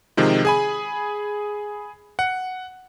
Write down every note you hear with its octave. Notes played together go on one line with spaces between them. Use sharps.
C3 D#3 F3 G#3
G#4 G#5 B5
F#5